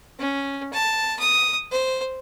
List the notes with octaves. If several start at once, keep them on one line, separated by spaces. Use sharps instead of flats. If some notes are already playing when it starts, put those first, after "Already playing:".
C#4
A5
D#6
C5